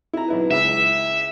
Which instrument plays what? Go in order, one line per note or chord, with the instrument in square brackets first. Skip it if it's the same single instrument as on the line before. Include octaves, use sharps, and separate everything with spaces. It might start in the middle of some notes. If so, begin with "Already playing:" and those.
[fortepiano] E4 A#5
B1 E4 B4
[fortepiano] C#2 E4 [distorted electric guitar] E5